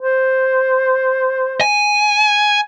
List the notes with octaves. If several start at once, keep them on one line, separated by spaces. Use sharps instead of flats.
C5
G#5